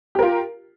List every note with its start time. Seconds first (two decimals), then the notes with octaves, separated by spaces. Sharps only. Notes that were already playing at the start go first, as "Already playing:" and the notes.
0.15 G4
0.19 A#4
0.22 F4